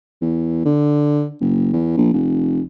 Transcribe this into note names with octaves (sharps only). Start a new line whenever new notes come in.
E2
D3
F#1
E2
A#1
F1